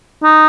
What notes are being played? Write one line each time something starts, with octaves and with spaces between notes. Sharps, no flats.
D#4